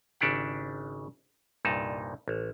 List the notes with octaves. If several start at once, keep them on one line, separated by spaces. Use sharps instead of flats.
G#1 C#3 D4 E4 G4 F#5
C2 G2 A#2 D#4 A5
A1